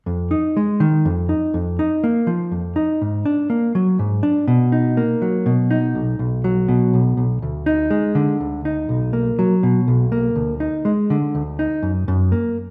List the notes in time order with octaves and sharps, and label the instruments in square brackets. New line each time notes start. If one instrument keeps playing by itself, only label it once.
[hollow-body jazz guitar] F2
D#4
G#3
D#3
F2
D#4
F2
D#4
A#3
F3
F2
D#4
G#2
D4
A#3
F#3
G#2
D4
B2
D#4
A#3
F#3
B2
D#4
B1
B1
F#3
B2
B1
B1
D2
D#4
G#3
D3
D2
D#4
B1
A#3
F#3
B2
B1
A#3
D2
D#4
G#3
D3
D2
D#4
F#2
F#2
A#3